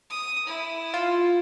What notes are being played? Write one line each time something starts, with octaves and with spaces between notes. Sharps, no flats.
D#6
E4
F4